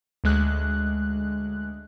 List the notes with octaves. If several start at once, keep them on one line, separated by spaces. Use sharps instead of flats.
D2 G#3 F#6